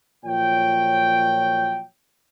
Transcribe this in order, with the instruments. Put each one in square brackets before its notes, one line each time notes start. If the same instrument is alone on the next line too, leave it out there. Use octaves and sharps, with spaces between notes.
[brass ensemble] A#2 F3 F#3 C#5 G5